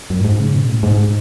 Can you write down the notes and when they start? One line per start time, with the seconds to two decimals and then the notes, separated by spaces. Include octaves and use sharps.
0.10 F#2
0.20 A2
0.25 G#2
0.40 C#3
0.54 B2
0.68 A2
0.83 G#2